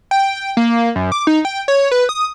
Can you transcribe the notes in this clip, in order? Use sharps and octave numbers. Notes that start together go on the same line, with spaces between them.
G5
A#3
F#2
D6
D#4
G5
C#5
B4
D#6